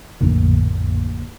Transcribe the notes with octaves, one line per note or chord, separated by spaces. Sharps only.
A#1 F2 A2 D3 A#3